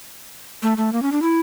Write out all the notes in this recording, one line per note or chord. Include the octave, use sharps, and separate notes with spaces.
A3
A3
A#3
C#4
D4
E4